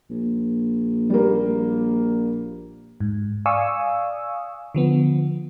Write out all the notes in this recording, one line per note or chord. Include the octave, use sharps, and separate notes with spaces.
A#1
G3 A#3
G#2
D5 F5 G#5 C#6 D#6 E6
D3 F3 B3